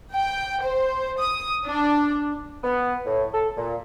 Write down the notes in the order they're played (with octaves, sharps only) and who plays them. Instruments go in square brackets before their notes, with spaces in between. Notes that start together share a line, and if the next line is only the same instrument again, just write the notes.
[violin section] G5
C5
D#6
D4
[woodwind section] B3
A2
A4
A#2